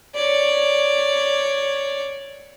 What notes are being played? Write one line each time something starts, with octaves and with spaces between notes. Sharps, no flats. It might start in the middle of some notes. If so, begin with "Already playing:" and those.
C#5 D5